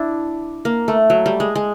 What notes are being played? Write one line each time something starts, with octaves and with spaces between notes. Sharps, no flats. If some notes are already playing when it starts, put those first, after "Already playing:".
Already playing: D4 E4
A#3
A3
F#3
G3
G#3
G#3